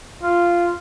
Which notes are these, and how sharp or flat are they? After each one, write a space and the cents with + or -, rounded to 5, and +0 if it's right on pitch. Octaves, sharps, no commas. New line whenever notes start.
F4 -10